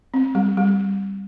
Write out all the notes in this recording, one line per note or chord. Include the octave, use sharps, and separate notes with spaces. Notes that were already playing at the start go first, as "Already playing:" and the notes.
C4
G3
G3